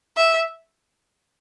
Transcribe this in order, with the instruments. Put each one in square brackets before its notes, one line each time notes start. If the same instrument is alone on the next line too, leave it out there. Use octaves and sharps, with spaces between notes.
[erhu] E5